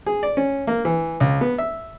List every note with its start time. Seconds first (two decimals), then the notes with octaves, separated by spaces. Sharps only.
0.06 G#4
0.23 D5
0.37 C#4
0.67 A#3
0.85 E3
1.20 C#2
1.41 B3
1.58 E5